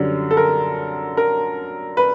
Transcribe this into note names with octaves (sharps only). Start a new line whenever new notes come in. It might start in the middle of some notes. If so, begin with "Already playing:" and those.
Already playing: F#2 D3 G3
A4
A#4
A#4
B4